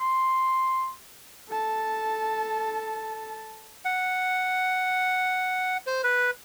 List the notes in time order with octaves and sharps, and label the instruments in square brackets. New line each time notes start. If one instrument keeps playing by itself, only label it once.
[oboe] C6
[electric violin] A4 A5
[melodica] F#5
C5
B4